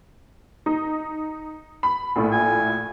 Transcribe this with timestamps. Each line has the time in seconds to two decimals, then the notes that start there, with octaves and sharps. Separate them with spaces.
0.66 D#4
1.83 B5
2.16 A#1 A2
2.32 G#5